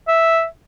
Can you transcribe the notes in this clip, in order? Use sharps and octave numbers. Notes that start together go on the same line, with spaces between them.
E5